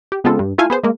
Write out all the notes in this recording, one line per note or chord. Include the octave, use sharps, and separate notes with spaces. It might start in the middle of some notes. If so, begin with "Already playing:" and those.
G4
C#3 G#3 B3 C4 F4 A4
G2
A3 E4 F4 A4 F5 G#5
B3 G#4 C5
G#3 A#3